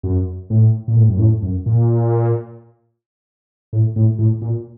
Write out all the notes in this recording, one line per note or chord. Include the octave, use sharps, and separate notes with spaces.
F#2
A2
A#2
A2
F#2
A2
F#2
A#2
A2
A2
A2
A#2